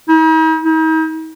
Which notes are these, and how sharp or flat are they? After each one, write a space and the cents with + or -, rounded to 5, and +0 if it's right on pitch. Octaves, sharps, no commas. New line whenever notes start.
D#4 +45
D#4 +40